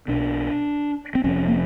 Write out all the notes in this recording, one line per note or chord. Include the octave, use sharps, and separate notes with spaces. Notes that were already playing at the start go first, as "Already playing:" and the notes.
B1 B2 D4
C4
F1 F2 C3 C#4
A#3